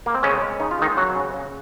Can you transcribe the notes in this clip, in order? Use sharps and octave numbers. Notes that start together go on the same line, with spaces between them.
A#3
C4
C#3 G#3 C#4
G#3
C#3 D#4
F4
D#3 G#3 D#4
C#3 F#3 F#4
C#3
C#3